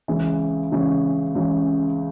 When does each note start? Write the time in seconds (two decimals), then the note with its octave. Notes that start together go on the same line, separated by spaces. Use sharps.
0.08 C#2 C#3 E3
0.72 C#2 C#3 E3
1.35 C#2 C#3 E3